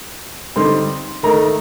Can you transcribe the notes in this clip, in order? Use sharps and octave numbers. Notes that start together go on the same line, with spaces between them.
D3 G3 C4 D#4 C6
D#3 A3 D#4 A#5